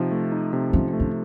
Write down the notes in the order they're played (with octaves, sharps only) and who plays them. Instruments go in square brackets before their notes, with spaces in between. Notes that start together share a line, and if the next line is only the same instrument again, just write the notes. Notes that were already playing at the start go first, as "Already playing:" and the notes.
Already playing: [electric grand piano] C3 F3 D#4
A3
D#4
C3
[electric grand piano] F3 [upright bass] C#4
[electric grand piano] A3
[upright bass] C#4